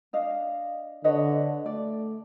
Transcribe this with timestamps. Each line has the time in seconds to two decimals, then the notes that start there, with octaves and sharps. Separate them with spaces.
0.13 D4 D#5 F5
1.04 D3 B4 C#5 D#5
1.66 A3 D5